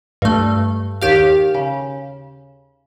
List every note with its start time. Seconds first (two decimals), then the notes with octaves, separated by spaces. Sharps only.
0.22 G2 A3
1.02 D#2 G4 F5
1.54 C#3